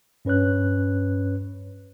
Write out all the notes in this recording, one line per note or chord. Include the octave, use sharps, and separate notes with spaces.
G2 C#4 B4 C#5 F#6